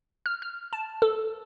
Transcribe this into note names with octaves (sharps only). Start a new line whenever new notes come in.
F6
F6
A5
A4